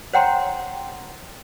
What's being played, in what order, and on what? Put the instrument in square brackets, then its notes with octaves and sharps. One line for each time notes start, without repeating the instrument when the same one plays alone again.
[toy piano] C5 C#5 F#5 G5 A#5 C6